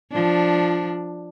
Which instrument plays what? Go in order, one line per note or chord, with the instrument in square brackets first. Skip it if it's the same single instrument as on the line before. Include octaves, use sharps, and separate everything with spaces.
[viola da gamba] F3 D4